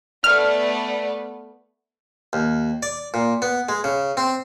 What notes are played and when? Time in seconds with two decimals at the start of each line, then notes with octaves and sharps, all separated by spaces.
0.24 A3 B3 D5 F6
2.33 D#2
2.83 D5
3.14 A#2
3.42 B3
3.69 G#3
3.84 C#3
4.17 C4